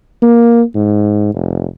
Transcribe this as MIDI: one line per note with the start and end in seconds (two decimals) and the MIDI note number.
0.22 0.62 58
0.75 1.30 44
1.35 1.66 29